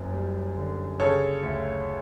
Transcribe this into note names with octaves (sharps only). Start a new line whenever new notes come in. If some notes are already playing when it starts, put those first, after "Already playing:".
Already playing: F#1 F#2
G3
D3
C#3 A4 C#5
D2